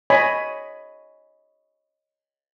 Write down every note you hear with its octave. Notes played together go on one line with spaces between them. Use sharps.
C#5 D#5 G#5 B5